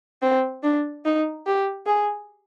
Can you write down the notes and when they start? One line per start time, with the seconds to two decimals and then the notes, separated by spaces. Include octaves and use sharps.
0.22 C4
0.63 D4
1.05 D#4
1.47 G4
1.86 G#4